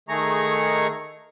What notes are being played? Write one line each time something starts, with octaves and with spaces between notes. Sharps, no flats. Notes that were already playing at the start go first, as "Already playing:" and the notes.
D#3 A3 G#4 A#5 C#6